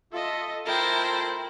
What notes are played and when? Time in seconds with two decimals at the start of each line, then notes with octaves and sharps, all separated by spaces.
0.12 F4 A4 D#5 E5
0.66 A3 E4 F4 A#4 C5 G5 A5